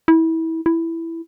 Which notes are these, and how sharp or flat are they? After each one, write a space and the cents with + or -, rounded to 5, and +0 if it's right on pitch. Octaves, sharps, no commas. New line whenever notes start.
E4 -25
E4 +5